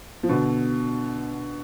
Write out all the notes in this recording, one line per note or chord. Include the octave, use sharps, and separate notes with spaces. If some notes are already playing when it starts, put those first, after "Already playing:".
F3
B2 D3